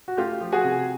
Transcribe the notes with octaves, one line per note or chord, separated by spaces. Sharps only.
F#4
A3 F4 G4
F3
F#4 G#4
C3